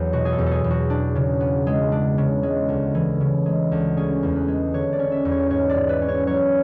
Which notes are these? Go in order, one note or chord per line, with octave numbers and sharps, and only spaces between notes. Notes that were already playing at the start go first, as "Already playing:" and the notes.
Already playing: E2 F#3 B4
B2 F#4
G#4
A4
E2
A4
G#4
E2
F#4
D4
C#3
B3
G#3
D4
C#3
G#3
D2
E3
C#3
G#3
D2
C#4 G#4
E2
B4
G#3
D3 C#5
D5
C#4
E5
E2
C#5
G#2 C#5
D5
G#2
B4
C#4
C#5
F#3 C#5